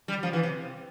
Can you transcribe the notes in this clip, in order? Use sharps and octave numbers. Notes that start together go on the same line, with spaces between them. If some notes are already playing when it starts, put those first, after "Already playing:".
G3
F3
E3
C3